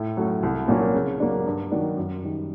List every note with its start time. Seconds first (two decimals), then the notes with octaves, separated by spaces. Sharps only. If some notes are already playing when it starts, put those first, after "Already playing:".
Already playing: A2
0.17 F#3 A3 C#4
0.43 C2
0.68 A#2 F#3 A#3 C#4
0.95 C#3
1.20 F#3 A#3 D4
1.46 G2
1.72 D#3 F#3 A#3 D4
1.97 F#2
2.23 D#3 G3